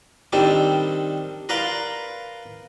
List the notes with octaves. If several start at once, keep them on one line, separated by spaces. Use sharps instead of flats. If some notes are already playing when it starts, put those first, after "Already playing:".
D#3 G3 C4 D4 G4 A4
A#4 B4 D5 F5 A#5 C6